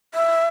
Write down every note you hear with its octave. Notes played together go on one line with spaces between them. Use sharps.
E5